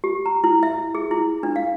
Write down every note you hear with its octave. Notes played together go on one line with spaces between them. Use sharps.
G4
A#5
E4
E5
G#4
E4
D4
F5